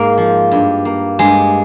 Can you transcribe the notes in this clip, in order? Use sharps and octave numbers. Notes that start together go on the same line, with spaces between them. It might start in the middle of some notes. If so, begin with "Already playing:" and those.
Already playing: G#2 A#3 A#4
F3
G2
A#3
G2 G#3 G#4